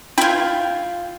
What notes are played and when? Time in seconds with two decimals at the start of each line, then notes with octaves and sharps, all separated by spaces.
0.18 E4 F4 G5 G#6